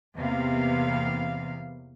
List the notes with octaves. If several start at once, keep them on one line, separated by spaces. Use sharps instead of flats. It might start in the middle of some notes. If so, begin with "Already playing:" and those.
E2 C3 A#3 B3 F5